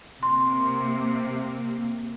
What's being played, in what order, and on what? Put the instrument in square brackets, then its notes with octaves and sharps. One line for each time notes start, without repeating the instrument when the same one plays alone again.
[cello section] C3 A#3 [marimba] C6